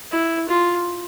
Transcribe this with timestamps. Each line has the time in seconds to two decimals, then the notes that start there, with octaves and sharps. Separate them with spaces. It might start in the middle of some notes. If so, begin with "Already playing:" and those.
0.12 E4
0.49 F4